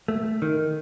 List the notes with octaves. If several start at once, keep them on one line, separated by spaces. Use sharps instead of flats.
A3
D#3